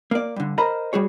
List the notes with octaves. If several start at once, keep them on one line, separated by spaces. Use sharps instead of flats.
A#3 D5
G2 D3
A#4 C5 D#5 A#5 B5
G3 F#4 G#4 C#5